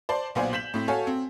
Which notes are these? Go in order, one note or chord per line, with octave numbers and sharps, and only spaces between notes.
C5 D5 A5 C6
B1 A#2 B3 C5 D5 G#5
G6 B6 E7 F#7
A2 C4
F#4 A4 C#5 F5 G#5
C4